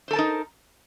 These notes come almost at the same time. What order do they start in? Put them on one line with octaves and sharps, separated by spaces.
C5 A4 A5 A#4 D#4